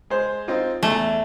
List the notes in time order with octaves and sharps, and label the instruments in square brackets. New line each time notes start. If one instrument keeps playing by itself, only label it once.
[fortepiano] G#3 C5
C4 D#4 F4
[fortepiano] E2 [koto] A3